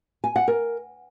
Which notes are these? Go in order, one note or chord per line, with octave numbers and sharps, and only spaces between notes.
G#5
F#5
A#4